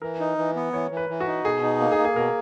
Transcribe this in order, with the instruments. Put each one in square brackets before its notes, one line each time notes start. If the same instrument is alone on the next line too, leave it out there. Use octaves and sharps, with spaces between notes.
[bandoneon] E3 [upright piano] A#4
[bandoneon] D#4
E3
B3
[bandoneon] E3 [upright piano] C#5
[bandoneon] E3
[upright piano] B4
[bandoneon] E3
[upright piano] F#4
[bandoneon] D#4
[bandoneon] B2 [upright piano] G#4
[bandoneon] D#4
A#3
[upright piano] G#4
[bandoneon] A#3
[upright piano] G#4
[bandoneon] B2 [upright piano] A#4